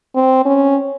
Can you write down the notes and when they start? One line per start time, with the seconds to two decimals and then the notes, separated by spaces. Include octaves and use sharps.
0.15 C4
0.45 C#4